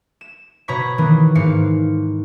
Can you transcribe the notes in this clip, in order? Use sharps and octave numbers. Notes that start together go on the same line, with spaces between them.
E7
B2 C#5 A#5 B5 C#6 B6
D#3 E3 A#3 B3
G#2 A#3 F5 C#7